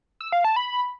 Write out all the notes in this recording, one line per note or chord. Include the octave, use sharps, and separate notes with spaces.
E6
F5
A5
B5